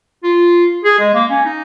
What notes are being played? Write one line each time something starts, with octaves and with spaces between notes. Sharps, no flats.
F4
G#4
G#3
A#3
C#4
D#4